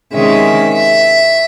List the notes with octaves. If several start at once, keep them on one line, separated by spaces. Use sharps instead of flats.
C3 D#3 G#3 C#4 E5
E5